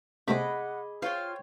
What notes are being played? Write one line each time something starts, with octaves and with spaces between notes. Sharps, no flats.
C3 A3 C4 G#4 D#5 F#5 B5 D6
F4 C5 C#5 G5 F6